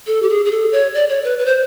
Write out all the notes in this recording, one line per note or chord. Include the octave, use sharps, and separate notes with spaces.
A4
G4
G#4
G#4
A4
C#5
D5
C#5
B4
B4
C5